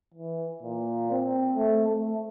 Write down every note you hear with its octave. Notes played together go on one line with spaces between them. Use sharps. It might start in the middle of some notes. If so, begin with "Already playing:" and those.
E3
A#2
C4
A3
A3